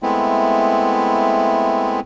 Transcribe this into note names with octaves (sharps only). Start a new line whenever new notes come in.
G#3 A3 B3 C4 E4